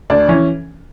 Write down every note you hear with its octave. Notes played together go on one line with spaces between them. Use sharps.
D2 D4
E3 C#4